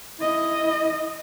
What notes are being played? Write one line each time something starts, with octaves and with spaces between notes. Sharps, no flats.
E4 D#5